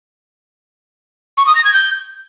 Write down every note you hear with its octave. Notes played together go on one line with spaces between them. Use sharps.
C#6
D#6
A#6
G#6
G6